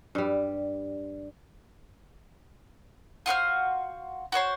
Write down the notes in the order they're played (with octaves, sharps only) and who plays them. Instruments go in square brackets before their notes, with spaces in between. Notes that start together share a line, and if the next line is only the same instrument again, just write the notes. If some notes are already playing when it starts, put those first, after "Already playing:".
[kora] G2 G3
[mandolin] F4 F#4 C5 F6
F#4 C5 C#5 C6